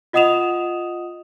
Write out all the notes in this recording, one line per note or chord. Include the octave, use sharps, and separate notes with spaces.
F4 D#5 F#5 D#6 E7 F7